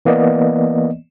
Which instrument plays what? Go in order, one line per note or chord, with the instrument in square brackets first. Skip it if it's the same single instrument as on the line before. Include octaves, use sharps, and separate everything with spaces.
[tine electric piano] E3 A#3 B3 D5 D#5